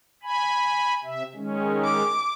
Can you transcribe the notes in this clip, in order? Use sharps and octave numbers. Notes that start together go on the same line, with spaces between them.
G#5 B5
C3 E5
D#3 G#3 C#4
D6